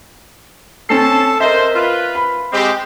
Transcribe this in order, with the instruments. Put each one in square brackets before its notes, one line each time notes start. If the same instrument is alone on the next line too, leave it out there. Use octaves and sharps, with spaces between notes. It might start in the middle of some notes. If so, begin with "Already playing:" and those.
[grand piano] C4 C#4 C7 [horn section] A4 A5
[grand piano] A#4 D#5 E5 [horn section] C5
[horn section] F4 B4
[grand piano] B5
[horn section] G#3 C4 G4